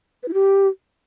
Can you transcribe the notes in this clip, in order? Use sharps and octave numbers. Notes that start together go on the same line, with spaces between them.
B4
E4
G4